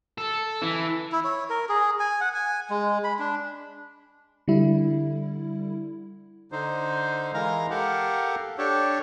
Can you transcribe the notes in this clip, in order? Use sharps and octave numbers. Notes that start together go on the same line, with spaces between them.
A4
E3
E4
C#5
A#4
G#4
G#5
F#5
G#5
G#3
B5
D4
D3 G3 E4
D3 D#4 C5
E3 G#3 A#4 F5 A#5
G4 A4 A#4 F5 F#5
D4 G4 A4 C#5